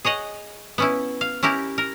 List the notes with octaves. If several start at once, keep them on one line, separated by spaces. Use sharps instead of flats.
G#4 C#5 D#5 F#5
B3 C#4 E4
F5
C#4 E4 G4 A#4
A#4